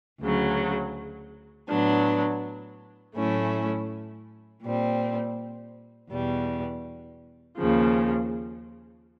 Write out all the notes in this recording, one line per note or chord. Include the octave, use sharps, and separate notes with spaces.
D2 C#3 F#3
A2 F#3 B3 D4
A2 F#3 A3 C#4 E4
A#2 G3 C4
E2 B2 G3
D#2 C#3 F3